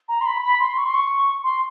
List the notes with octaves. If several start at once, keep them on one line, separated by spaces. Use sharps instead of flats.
A#5
C6
B5
B5
C6
C#6
C6
C#6
C6